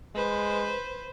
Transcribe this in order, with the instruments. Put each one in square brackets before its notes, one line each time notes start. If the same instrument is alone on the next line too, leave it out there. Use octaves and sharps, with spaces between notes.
[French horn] G#3 [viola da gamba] B4 C5